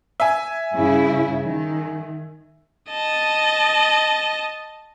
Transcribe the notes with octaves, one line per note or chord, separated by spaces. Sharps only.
E5 G#5
G2 C#3 E4
D#3
D#5 A5